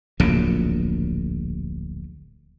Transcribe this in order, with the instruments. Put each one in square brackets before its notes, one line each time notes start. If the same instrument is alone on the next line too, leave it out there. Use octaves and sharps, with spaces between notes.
[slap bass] D1 A#1 F#2 C#3